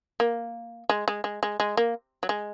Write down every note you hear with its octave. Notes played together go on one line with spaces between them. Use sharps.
A#3
G#3
G#3
G#3
G#3
G#3
A#3
F#3
G#3